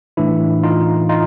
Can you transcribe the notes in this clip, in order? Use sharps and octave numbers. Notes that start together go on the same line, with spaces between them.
A2 E3 D4 E4
D#4 F4
D#4 F4